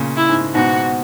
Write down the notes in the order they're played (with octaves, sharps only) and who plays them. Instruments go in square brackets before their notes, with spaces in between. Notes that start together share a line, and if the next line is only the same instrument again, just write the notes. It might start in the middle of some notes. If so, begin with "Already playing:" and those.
Already playing: [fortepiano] A#2 C#3
[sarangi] E4
[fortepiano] G#2
[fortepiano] G#2 B2 [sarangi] F#4